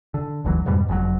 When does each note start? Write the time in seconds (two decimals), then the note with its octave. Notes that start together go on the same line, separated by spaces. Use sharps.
0.14 D3
0.45 F#1 D2 E3 F#3
0.66 F2 G#2 B2 G3
0.88 F#1 F2 A2 F#3